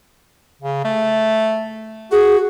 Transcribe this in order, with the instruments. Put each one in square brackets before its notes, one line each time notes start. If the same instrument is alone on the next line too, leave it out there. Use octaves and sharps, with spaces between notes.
[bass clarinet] C#3
A3
[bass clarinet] F#4 [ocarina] G#4